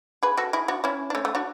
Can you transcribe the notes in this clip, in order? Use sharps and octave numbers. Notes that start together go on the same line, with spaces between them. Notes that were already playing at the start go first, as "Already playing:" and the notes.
G#4 B4
F#4 A4
E4 G#4
D4 F#4
C#4 E4
D4
A3 C#4
A3
D4 F#4